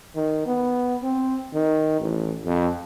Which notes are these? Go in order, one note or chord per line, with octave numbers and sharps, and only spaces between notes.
D#3
B3
C4
D#3
A1
F2